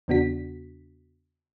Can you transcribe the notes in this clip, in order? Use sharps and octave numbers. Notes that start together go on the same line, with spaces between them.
E2 C#3 B3 D4 F#4 B6